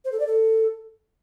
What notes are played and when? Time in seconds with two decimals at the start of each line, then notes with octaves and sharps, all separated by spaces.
0.05 C5
0.12 A4
0.20 D5
0.27 A4